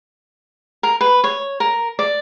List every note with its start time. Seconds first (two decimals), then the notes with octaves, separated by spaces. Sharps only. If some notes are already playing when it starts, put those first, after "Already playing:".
0.83 A#4
1.01 B4
1.24 C#5
1.60 A#4
1.99 D5